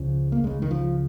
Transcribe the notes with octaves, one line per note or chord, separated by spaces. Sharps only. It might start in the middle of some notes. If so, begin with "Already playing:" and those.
Already playing: C#2 C#3 F3
A#3
C#2 C#3 G#3
D#3
F3